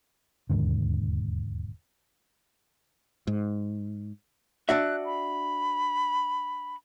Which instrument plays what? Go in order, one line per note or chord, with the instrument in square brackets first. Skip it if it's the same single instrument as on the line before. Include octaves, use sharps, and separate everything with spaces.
[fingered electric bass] E1 D#2 G#2 D3
[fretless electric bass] G#2
[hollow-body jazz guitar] D4 F#4 E5 [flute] F#6
[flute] B5